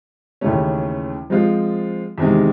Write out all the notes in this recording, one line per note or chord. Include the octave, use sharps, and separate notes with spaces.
D#2 C#3 E3 A3 C#4
F3 G#3 C4 F4
E2 C3 D#3 G#3